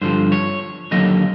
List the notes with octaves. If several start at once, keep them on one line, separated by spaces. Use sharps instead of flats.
G2 D3 F3 C5
C#5
D#2 D3 F#3 A#3 D#5